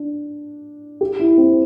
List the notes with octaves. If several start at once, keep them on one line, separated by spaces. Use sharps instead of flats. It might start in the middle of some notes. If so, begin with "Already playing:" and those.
Already playing: D4
G4
E4
C4